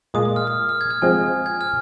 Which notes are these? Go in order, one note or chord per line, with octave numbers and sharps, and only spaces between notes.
A#2 G#3 F4 D#6
D#6
F6
F6
F6
G#6
F6
F3 G#3 C4 G#5
G#6
F6